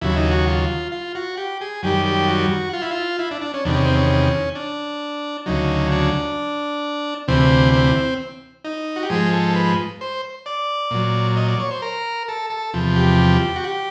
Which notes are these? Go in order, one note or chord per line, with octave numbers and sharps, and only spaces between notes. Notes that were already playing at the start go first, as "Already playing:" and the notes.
D#2 C#3 F#3 E4
D#4
F#4
F4
F4
F#4
G4
G#4
F#2 D#3 G3 G4
G4
F#4
F4
E4
F4
E4
D4
D4
C#4
E2 C3 D#3 D4
C#4
C4
C#4
D4
D2 C#3 F#3 D#4
D4
D2 C3 E3 C4
C4
D#4
F#4
G4
G#2 F3 G#3 G#4
A4
B4
C5
D5
A#2 F#3
D#5
D5
C#5
C5
A#4
A4
A4
E2 C3 F3
G4
F#4
G4